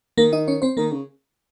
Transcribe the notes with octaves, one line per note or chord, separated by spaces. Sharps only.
D#3 A#3 A#4
D#4 D#5
C#4 C#5
C4 C5
D#3 A#3 A#4
C#3